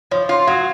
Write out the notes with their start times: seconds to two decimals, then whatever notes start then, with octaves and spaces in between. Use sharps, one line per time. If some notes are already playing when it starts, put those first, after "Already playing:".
0.11 F3 C#5
0.29 F4
0.47 F#3 F5